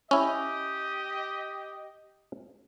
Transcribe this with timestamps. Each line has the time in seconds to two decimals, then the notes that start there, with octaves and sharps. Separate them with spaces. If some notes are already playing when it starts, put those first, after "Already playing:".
0.11 C#4 E4 G4 D#5